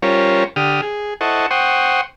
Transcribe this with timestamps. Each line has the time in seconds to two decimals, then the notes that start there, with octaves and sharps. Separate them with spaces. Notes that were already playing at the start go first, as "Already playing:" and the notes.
0.03 G3 C#4 F4 A#4 C5 C#5
0.56 D3 G4 D#6 F6
0.82 G#4
1.21 E4 A4 C5 D#5 F#5 C#6
1.51 C5 F#5 G5 C6 C#6 D#6